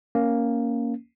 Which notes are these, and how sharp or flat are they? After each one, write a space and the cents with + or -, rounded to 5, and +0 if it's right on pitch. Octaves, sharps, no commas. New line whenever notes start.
A#3 +0 C#4 +0